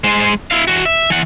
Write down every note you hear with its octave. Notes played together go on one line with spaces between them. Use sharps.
G#3 C5
E4 F5
E3 F#4
E5
E3 F#5